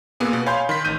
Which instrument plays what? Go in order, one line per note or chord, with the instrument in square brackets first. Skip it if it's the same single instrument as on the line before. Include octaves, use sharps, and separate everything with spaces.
[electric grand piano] A#2 A#3 B3 G#4
B2
C#5 F5 G#5 B5 C6 G6
D#3 C6 B6
A1 G6 D#7